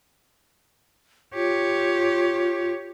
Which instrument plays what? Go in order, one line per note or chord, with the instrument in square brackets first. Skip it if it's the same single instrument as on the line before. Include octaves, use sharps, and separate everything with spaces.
[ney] F4 [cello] G4 C#5